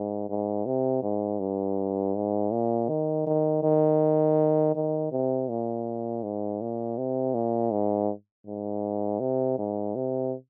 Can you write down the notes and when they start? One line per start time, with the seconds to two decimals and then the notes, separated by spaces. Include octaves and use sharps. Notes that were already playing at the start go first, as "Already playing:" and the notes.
Already playing: G#2
0.29 G#2
0.66 C3
1.03 G#2
1.40 G2
2.15 G#2
2.51 A#2
2.89 D#3
3.27 D#3
3.63 D#3
4.75 D#3
5.11 C3
5.49 A#2
6.23 G#2
6.61 A#2
6.98 C3
7.34 A#2
7.71 G#2
8.46 G#2
9.20 C3
9.58 G#2
9.95 C3